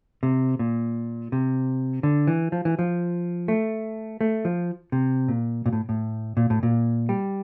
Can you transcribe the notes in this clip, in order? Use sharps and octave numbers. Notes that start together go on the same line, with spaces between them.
C3
A#2
C3
D3
E3
F3
E3
F3
A3
A3
F3
C3
A#2
A#2
A2
A2
A#2
A2
A#2
G3